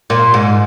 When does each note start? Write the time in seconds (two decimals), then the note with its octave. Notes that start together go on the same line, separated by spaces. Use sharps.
0.10 A#2
0.34 G#2